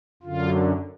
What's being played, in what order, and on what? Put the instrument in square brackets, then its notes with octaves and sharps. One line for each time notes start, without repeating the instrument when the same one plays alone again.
[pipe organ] F#2 D3 F4